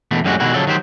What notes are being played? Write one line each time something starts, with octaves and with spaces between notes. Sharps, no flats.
E2 B2 A3
F#2 A2 G3 G#3 C#4 F#4
B2 D3 D#3 G#3 E4 F#4
C#3 F3 F#3 A4
D#3 F#3 G4 C5